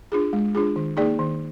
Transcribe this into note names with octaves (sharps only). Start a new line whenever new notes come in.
D4 F4 G#4
G#3
D4 F4 G#4
D#3
A#3 D#4 G#4 D5
D#3